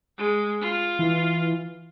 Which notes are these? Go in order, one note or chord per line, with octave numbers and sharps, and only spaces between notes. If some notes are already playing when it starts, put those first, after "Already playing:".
G#3
F4
E3